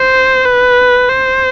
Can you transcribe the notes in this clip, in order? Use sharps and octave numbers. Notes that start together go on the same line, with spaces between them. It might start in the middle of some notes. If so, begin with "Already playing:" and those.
Already playing: C5
B4
C5